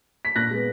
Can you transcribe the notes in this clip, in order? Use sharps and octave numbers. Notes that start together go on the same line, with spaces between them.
B6
A#2 F#6 A#6
G#3 B3